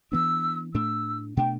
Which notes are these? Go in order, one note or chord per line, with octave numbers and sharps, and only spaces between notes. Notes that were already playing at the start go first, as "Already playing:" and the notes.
E3 B3 D4 E6
A2 A3 D4 E6
B2 A3 D4 G5